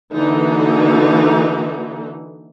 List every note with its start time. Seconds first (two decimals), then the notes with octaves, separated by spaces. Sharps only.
0.14 D3 E3 A#3 D#4 F#4